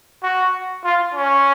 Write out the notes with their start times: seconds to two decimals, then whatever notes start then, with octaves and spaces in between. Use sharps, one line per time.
0.23 F#4
0.84 F4
1.15 C#4